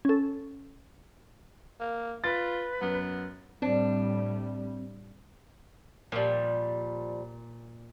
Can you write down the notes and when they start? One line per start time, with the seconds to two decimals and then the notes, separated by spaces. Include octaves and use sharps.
0.05 C#4 A4
1.80 A#3
2.24 F4 B4 A6
2.81 F#2 B3
3.62 A2 G3 C4 D4
6.12 A#2 F3 G3